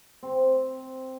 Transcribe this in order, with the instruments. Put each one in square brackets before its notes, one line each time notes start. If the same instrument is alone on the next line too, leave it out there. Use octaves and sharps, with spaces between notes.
[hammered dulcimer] C4